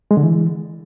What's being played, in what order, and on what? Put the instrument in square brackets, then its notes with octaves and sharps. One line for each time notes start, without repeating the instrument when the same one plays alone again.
[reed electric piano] G#3
D3
E3